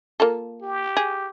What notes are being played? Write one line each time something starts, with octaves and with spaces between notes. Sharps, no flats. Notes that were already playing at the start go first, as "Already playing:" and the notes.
A#3 F4 A4
G4
G#4